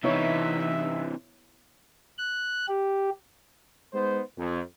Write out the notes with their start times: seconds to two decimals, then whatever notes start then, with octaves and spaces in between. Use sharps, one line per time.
0.04 C3 E3 B3 D#4 E4 C#5 E5
2.18 F#6
2.68 G4
3.93 G#3 B3 D#4 C5
4.37 F2